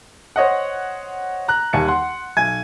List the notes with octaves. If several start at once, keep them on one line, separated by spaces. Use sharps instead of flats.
C5 C#5 D#5 F#5
A#5 F#6
D#2 G3 G#5 A5 C#7
F#5 C6
B1 G#5 G#6